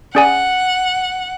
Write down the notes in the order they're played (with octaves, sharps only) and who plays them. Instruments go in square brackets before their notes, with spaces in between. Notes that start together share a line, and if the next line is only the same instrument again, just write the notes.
[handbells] C#4 G#4 D5 G#5 [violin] F#5